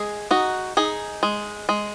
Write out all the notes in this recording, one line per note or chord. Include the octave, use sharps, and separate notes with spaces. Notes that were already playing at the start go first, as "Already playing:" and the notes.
Already playing: G#3 G#4
D#4 F#4
D#4 G#4
G#3
G#3